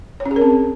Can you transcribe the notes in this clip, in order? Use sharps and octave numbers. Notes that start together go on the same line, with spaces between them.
C#5
C#4
G#4
A#4
C4